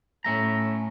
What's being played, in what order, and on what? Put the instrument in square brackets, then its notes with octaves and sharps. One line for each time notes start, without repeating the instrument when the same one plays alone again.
[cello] A2 [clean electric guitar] C#4 E5 A#5